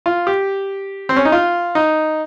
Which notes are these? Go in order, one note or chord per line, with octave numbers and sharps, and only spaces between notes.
F4
G4
C4
C#4
D#4
F4
D#4